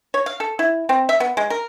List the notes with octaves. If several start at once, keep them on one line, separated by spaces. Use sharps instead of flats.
C#5
F5
A4
E4
C4
E5
B3
G#3
A#4